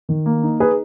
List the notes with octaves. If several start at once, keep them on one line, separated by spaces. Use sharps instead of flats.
D#3
A#3
D#4
D#4 G#4 B4